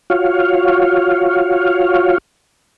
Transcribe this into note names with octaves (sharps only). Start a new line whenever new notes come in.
F4 F#4 C#5 F5